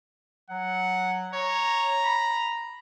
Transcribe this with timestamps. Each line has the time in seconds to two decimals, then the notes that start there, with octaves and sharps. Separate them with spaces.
0.50 F#3 F#5
1.33 C#5 A#5
2.04 B5